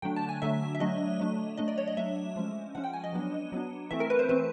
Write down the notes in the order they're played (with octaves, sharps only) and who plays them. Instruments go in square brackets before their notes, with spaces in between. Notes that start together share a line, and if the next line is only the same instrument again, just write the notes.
[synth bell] D3 F#3 A3 D4 G5
A5
G#5
D3 F#3 A3 D4 E5
E5
F#3 A3 D4 D#5
F#3 A3 D4
F#3 A3 D4 D#5
D5
C#5
D#5
F#3 A3 D4 E5
F3 G#3 C#4
F3 G#3 C#4 F#5
G5
G#5
D#5
F#3 B3 D4
F#3 B3 D4
E3 A3 C4 E5
A#4
B4
C5
E3 A3 C4 B4